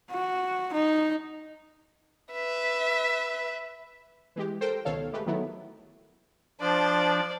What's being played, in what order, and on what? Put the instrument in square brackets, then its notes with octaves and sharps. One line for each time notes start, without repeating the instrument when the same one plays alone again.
[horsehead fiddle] F#4
D#4
[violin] B4 E5
[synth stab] E3 G#3 G4
A4 A#4 C5 G5
C#2 B2 D#3 A4 C#5 F5
G#3 A3 G4 B4
D#3 F#3 A3 B3 E4
[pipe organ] F3 D4 [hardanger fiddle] C5 D5